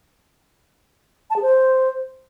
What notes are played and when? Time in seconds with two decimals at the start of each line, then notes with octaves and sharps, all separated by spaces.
1.30 A5
1.36 G#4
1.42 C5